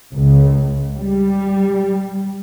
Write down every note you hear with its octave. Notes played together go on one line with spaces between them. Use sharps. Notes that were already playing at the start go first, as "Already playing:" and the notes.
C#2
G3